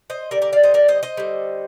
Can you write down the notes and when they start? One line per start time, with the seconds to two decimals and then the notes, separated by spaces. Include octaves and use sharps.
0.10 C5 D#5
0.31 D3 G3 A#4 D5
0.42 A#4 D5
0.53 D5 F5
0.63 C5 D#5
0.74 A#4 D5
0.88 C5 D#5
1.03 C5 D#5
1.17 D3 G3